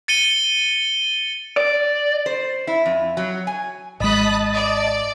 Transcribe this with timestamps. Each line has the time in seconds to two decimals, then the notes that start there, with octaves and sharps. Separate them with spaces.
0.08 A6 C#7 D#7 G7
1.57 D5
2.26 C5
2.67 E4
2.86 F2
3.17 F#3
3.47 G#5
4.00 G#1 G#3 D#5 A5 B5 D#6 F#6
4.54 D5